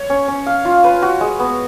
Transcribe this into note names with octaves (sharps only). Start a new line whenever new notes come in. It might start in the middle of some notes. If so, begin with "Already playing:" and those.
Already playing: C#5
C#4
C#4
F5
F4
B4
F#4
G#3
B3